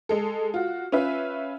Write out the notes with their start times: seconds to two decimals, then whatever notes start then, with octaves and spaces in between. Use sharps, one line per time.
0.09 G#3 A4
0.54 F4 F#4
0.92 C#4 F4 B4 E5